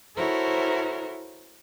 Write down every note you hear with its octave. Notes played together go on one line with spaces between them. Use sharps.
E4 F#4 A4 A#4 C5 C#5